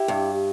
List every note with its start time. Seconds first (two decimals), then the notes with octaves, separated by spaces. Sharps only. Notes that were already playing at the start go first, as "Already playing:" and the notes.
Already playing: E4 G4
0.08 G2